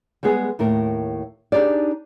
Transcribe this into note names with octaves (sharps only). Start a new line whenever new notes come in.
G3 G#3 B3 G#4
D#2 A2 A#4
D4 D#4 G4 G#4 D5